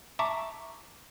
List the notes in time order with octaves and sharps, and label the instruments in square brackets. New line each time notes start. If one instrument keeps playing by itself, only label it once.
[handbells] E5 A5 A#5 C#6 D6